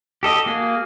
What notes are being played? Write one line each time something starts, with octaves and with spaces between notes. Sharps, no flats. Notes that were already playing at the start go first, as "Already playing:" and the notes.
G4 A4 D#5
A#3 F#4 G#4